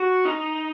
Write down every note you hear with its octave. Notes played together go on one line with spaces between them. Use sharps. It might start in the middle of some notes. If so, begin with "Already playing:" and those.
Already playing: F#4
D#4